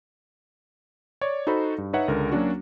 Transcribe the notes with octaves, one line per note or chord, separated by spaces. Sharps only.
C#5 D5
D#4 F#4 A4 C5 B5
G2
D#4 B4 C#5 E5 F#5
C#2 D3 A#4
F#3 A#3 C#4 D4 F#4